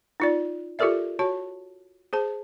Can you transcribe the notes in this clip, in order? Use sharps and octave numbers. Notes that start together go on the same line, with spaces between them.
D#4 F4 D5
F4 G4 A4 A#4 D5 E5
F#4 C#5 A5
G#4 C5 A5